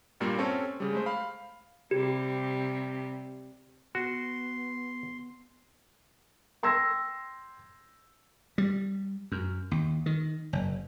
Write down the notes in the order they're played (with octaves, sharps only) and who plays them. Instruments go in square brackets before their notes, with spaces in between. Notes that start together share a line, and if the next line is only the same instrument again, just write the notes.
[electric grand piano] G2 A#2 G3 A#3
C4 C#4 A4 C#5
C#3 G3
G#3 A3 C5
F5 B5
[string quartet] C3 G3 [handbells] G4
[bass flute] B3 [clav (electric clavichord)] F#4 [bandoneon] C6
[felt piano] G5 C6 E6 G#6 A#6
[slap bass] G3
F#2
D#2
D#3
F#1